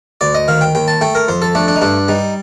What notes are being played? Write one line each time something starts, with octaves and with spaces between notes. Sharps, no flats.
D2 D5
D#5
D#3 F5
G5
D#2 G5
A5
A3 G5
A#4
F2 C5
A4
A3 D4
D4
D#4
G2 D4
G3 D#4